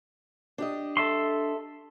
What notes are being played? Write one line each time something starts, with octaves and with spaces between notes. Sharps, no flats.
D4 G4 D#5
A4 E5 C6